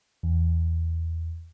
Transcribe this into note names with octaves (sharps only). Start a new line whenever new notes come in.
E2